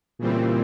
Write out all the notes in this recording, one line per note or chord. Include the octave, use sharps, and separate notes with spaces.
A#2 C#3 E3 G3 C4